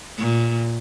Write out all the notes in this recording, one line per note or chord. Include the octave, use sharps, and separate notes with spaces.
A#2